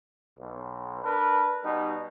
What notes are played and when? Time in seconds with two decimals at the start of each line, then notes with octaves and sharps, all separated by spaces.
0.39 B1
1.04 D4 A#4 B4
1.64 B2 G3 D#4